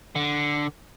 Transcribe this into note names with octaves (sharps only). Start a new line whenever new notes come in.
D3